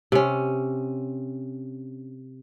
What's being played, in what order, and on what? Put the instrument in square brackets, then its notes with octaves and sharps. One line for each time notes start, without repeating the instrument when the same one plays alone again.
[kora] C3 C#4